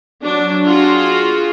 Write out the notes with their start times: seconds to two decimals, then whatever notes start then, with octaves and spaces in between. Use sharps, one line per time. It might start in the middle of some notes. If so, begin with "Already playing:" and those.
0.21 F#3 D4
0.66 F4 F#4 G#4